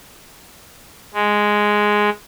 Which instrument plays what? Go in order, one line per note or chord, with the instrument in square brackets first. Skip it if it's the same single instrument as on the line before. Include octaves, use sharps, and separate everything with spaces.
[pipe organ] G#3